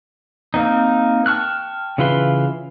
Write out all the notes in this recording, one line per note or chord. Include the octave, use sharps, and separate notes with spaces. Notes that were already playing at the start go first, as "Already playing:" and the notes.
A#3 C4 D#4
G5 A5 C#6 F6 F#6
C#3 E3 F4 B4 C6